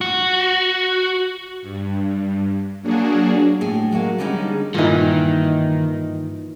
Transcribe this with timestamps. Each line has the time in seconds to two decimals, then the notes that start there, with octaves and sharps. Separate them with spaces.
0.01 F#4
1.62 G2
2.82 F#3 A#3 D4 F#4 G#4
3.61 A2 G#4
3.91 F#3 G#3 A#3 F#4
4.18 D3 G3 G#3 C#4 D#4
4.74 G2 A#2 D#3 E3 D#4